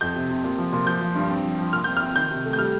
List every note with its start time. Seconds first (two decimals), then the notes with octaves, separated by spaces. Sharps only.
0.01 F2 G6
0.15 C3
0.30 C3
0.44 A#2
0.58 F3
0.73 A#2
0.86 F3 G6
1.01 F3
1.15 G2
1.29 C4
1.44 F3
1.58 F3
1.73 A#2 F6
1.84 C4 G6
1.97 C4 F6
2.16 D#3 G6
2.31 C3
2.45 A3
2.53 G6
2.59 G3 F6